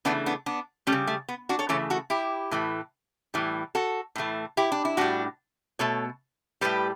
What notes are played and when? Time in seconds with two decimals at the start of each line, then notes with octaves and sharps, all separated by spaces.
0.05 C#3 E3 A3 B3 D4
0.26 B3 D4
0.46 B3 D4
0.87 G3 A3 C#4
0.92 C#3
1.07 A3
1.29 B3
1.49 D4 F#4
1.59 A4 C#5
1.69 C#3 E3 A3 A4 C#5
1.90 F#4 A4
2.10 E4 G4
2.51 A2 E3 A3
3.34 A2 E3 G3
3.75 F#4 A4
4.16 A2 E3 A3
4.57 E4 G4
4.72 D4
4.85 E4
4.97 A2 G3 D4 F#4
5.79 B2 A3 A4 C#5
6.61 A2 E3 G3 G4 B4